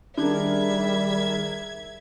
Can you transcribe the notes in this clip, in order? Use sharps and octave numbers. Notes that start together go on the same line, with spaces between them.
D#3 G3 D4 G#4 A#4 E5 G#6